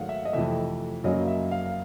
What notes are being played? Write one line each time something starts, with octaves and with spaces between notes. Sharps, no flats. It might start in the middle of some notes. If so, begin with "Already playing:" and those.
Already playing: G#2 D#3 F#3 A3 F5 F#5
E5
D#5
F2 C3 E3 A3 E5
F#2 C#3 F#3 A#3 D#5
E5
F5